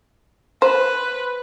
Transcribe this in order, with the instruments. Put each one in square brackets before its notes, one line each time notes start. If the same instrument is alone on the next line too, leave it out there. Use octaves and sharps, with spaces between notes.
[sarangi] B4 [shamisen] C5